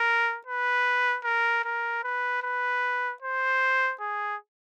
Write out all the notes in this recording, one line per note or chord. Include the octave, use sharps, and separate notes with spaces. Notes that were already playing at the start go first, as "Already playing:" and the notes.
Already playing: A#4
B4
A#4
A#4
B4
B4
C5
G#4